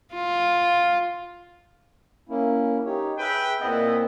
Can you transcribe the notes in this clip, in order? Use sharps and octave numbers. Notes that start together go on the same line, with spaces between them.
F4
A#3 C#4 E4
D#4 G4 C#5
G#4 B4 E5 G5
A#2 B3 C4 E4 D#5 F#5